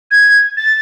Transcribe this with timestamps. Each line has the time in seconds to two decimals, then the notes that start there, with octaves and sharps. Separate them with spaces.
0.11 G#6
0.57 A6